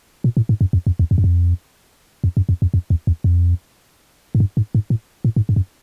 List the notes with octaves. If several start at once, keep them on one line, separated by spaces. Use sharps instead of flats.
A#2
A2
G#2
F#2
F2
F2
E2
F2
F#2
F2
F2
F#2
F2
F2
F2
E2
E2
F2
G#2
G2
G#2
G#2
A2
A2
G#2
G2
F#2